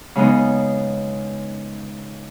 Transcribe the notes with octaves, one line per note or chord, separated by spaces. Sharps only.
C#3 G#3 B3 D#4